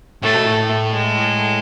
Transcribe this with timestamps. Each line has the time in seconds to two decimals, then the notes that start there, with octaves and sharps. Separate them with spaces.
0.22 A2 A3
0.33 B2
0.45 A2
0.92 G#3